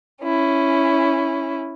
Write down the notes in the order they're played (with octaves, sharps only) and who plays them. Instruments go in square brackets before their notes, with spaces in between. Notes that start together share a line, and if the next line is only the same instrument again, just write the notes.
[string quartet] C#4 E4